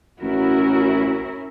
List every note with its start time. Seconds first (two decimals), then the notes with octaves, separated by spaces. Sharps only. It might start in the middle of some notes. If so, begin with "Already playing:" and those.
0.23 A1 C#4 E4 F#4 A#4